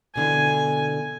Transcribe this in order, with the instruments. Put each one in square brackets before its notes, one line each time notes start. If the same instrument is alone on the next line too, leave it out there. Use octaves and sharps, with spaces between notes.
[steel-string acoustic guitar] B2 D3 E3 [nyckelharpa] G#5